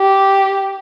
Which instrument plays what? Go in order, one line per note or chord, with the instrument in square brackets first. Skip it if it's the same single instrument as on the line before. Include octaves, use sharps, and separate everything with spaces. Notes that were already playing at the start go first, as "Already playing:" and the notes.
Already playing: [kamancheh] G4